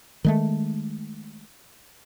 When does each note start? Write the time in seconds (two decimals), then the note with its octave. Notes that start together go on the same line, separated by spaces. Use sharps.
0.24 D#3 G#3 A3